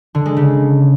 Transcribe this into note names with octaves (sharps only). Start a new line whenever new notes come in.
D3
G#3
C#3